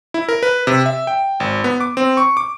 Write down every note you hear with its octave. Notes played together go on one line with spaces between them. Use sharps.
E4
A#4
B4
C3
E5
G5
G#1
B3
D6
C4
C#6
D6